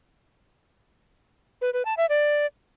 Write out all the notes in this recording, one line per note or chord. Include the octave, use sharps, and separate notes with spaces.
B4
B4
A5
E5
D5